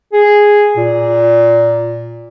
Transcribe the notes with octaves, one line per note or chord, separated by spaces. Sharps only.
G#4
A#2